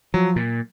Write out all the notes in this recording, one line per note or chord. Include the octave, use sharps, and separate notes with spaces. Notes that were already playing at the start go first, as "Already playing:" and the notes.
F3 F#3
A#2